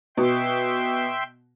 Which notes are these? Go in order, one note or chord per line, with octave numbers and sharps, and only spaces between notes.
B2 E5 G5 C6